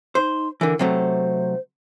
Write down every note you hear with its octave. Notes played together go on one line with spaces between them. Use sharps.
D#4 C5
D3 E3 A#4
C3 F#3 A3 C5